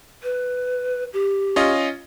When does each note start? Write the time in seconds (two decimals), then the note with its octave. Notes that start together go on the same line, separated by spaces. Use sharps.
0.23 B4
1.13 G4
1.56 C#4 F4 D#5